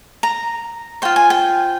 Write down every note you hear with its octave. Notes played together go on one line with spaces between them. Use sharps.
A#5
F4 C5 G5
G#5
G5